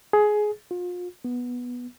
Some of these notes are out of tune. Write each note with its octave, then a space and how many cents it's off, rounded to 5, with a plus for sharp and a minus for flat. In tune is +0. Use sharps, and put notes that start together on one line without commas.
G#4 +15
F4 +35
B3 -10